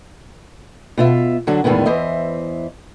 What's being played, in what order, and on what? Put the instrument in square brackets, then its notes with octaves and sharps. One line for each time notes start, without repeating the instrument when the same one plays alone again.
[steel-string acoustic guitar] B2 F4 E5
D3 F#3 D4
E2 A2 D#3 G#3 B3
E2 E3 C5 D#5 E5